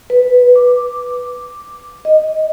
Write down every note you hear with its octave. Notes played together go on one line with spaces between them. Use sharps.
B4
D6
D#5